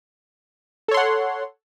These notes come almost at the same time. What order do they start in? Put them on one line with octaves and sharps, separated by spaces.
A4 C#5 C6 F#5